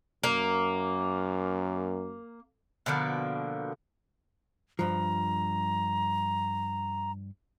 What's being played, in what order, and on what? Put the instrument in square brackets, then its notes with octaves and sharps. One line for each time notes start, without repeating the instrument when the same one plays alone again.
[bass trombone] F#2 [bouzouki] A#3
[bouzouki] B2 D3 F3 A#3
[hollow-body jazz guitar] G2 F3 [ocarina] A#5